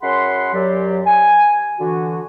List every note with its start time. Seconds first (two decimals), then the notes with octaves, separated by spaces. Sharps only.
0.03 F#2 C#4 G#4 F#5 B5 C6
0.53 F#2 F#3 G4 D5
1.06 G#5
1.79 D3 E3 F#4